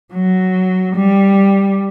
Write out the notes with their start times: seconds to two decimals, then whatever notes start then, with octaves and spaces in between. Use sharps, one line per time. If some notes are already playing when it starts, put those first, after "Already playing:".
0.13 F#3
0.96 G3